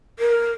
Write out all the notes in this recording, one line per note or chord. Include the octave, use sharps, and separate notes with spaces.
A#4